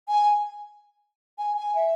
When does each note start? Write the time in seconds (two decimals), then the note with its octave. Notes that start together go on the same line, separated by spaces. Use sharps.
0.08 G#5
1.38 G#5
1.57 G#5
1.75 E5